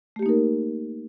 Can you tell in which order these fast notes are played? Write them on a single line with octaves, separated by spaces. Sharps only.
A3 G4 A#3 D#4 A#4